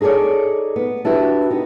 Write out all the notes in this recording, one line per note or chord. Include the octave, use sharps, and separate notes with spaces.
D#4 G#4 A4 C#5 D5
B3
D4 E4 F#4 G4 B4
B3 D#4